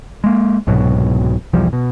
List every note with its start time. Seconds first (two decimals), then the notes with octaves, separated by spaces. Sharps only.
0.24 G#3 A#3
0.67 C2 G#2 B2 F#3
1.53 B1 E2 F3 G3
1.73 B2